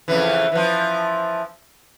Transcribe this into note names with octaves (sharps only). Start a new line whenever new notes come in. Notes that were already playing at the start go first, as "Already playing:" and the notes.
F2 C#3 E3
E3 F3